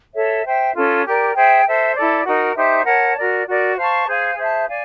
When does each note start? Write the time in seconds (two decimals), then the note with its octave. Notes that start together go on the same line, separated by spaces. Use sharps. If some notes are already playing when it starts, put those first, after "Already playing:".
0.14 A4 C#5 E5
0.44 C5 E5 G5
0.74 C#4 F4 A4
1.04 G4 A#4 D5
1.35 G#4 C5 E5 G5
1.65 A4 C5 E5
1.95 E4 A4 D5
2.26 D#4 F#4 A#4
2.56 D#4 G4 C5 E5
2.85 A#4 C#5 F#5 A5
3.16 F#4 A#4 D5
3.46 F#4 A#4 D5
3.76 C5 F5 A5 C#6
4.06 G#4 C5 F5 G#5
4.36 G#4 C5 E5 A5
4.67 D5 F5 G#5